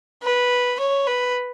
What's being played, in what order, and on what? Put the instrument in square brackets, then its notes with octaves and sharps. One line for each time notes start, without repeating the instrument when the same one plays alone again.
[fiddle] B4
C#5
B4